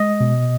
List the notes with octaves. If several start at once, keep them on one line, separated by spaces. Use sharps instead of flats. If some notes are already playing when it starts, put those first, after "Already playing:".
Already playing: G#3 D#5
B2